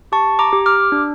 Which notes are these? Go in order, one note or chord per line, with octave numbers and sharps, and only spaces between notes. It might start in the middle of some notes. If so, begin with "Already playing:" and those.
G4 A5 C#6
A#5 D6
G4
D6 F6
D4